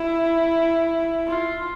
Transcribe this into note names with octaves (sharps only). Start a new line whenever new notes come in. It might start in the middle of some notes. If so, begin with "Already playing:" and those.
Already playing: E4
F4